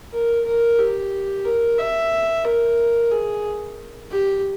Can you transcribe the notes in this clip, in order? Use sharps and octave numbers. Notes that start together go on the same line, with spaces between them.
A#4
A#4
G4
A#4
E5
A#4
G#4
G4